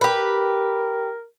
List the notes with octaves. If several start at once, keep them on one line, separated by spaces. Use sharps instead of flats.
G4 A#4 B4